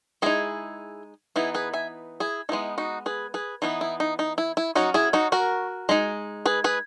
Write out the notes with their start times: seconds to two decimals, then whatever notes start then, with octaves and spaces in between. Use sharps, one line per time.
0.22 G#3 D#4 E4 G#4
1.36 E3 B3 D#4 E4 G#4
1.54 G#4 B4
1.73 E5 G#5
2.20 E4 G#4
2.49 G#3 B3 D#4 E4
2.78 D#4 F#4
3.06 G#4 B4
3.34 G#4 B4
3.62 E3 B3 D#4 E4
3.81 E4
4.00 D#4
4.19 D#4
4.38 E4
4.57 E4
4.75 F#3 C#4 D#4 F#4
4.94 E4 G#4
5.13 D#4 F#4
5.32 F#4 A#4
5.89 G#3 D#4
6.46 G#4 B4
6.64 G#4 B4